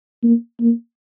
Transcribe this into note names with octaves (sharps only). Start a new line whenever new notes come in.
A#3
A#3